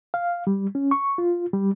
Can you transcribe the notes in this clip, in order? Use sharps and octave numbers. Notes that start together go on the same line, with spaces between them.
F5
G3
C#4
C#6
F4
G3